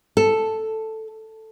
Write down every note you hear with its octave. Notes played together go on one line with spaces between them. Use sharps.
A4